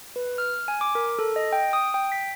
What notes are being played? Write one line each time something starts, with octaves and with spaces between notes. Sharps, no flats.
B4
F6
G#5
D6
A#4
A4
D#5
G5
D#6
G5
B6